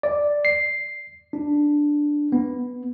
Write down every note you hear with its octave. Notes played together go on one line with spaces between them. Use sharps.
D5
C7
D4
B3